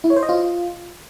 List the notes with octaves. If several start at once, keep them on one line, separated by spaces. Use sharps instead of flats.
E4
C#5
C5
D#5
F4